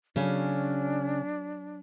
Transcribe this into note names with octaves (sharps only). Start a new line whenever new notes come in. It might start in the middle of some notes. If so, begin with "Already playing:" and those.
C#3 F#3 C#4 D4